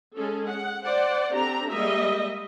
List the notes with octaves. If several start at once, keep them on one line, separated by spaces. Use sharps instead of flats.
G#3 C#4 G#4 A4
F#5
C5 D5 F#5
C4 D4 G4 A4 A#5
G3 G#3 A#3 D#5 E5